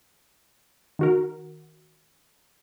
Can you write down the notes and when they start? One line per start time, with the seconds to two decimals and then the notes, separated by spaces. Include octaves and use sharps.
0.99 D#3 F#4 A#4